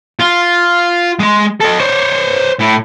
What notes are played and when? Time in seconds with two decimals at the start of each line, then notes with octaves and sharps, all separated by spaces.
0.20 F4
1.20 G#3 C6
1.61 A4 D#5
1.80 C5 C#5
2.59 A2